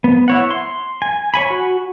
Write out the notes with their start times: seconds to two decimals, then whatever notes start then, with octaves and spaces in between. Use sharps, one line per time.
0.04 B3
0.28 E4 C#5 F#5
0.51 C6
1.02 G#5
1.34 C#5 G#5 B5
1.50 F#4